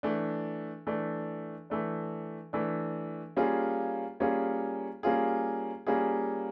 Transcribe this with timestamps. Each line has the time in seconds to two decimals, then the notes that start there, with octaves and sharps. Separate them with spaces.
0.03 E3 A3 D4
0.87 E3 A3 D4
1.70 E3 A3 D4
2.53 E3 A3 D4
3.37 G3 A#3 C#4 F4 G#4
4.20 G3 A#3 C#4 F4 G#4
5.03 G3 A#3 C#4 F4 G#4
5.87 G3 A#3 C#4 F4 G#4